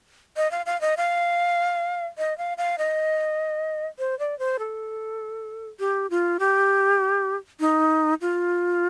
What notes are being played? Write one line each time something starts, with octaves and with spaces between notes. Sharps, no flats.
D#5
F5
F5
D#5
F5
D#5
F5
F5
D#5
C5
D5
C5
A4
G4
F4
G4
D#4
F4